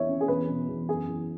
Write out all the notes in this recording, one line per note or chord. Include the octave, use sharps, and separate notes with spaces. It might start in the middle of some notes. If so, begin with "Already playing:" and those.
Already playing: E2 E3 C#5 E5
C#4
G#4
E2 B4
B2
E2
F#2 G#4
E3